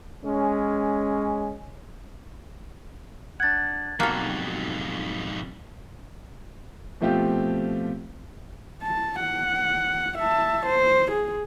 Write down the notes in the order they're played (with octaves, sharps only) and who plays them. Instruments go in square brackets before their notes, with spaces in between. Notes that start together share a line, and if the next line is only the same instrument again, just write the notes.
[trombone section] G#3 C#4
[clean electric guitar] D4 F#5 [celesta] G#6 A6
[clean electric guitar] B1 G3 F#4 [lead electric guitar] F2 G#2 [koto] A#3 A4
[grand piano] B2 F3 A3 C4 F4 G4
[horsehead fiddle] A5
F#5
E5 A5
C5
G#4